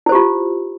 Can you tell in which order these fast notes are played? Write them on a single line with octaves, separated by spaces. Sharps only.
E4 C5 G4 F4